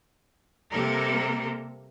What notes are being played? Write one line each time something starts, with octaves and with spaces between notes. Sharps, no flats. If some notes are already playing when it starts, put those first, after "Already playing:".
C3 G3 A#3 A4 A#4